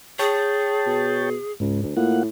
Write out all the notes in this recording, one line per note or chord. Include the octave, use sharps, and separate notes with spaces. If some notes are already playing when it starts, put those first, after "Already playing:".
G#4 C#5 G5 A5
B2
C#2 G#2
D2
A2 A#3 F4 F#5